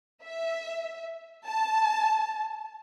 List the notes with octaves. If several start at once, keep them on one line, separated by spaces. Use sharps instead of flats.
E5
A5